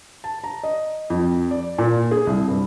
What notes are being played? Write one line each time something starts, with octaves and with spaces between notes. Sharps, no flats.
A5
A#5
D#5
F2
D5
A#2
G#4
C2
G2